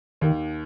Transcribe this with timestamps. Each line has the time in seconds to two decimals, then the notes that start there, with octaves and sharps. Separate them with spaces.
0.21 D#2 D#3